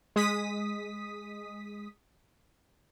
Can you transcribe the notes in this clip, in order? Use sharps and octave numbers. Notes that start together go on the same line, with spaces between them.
G#3 D#6 B6